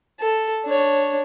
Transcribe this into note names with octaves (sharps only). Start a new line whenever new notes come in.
A4
D4 C#5